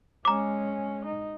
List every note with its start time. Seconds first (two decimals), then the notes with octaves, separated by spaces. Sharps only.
0.25 G#3 C#4 A#5 D6
1.05 D#4